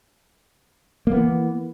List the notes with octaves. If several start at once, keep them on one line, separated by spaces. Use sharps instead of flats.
E3 A#3 B3